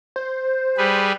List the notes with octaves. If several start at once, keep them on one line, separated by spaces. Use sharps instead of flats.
C5
G3 G#4 B4